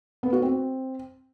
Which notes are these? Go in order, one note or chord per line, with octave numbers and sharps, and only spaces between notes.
B3
F#4
C4